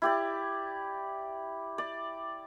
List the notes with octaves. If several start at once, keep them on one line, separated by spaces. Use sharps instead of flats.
E4 G4 D5
D5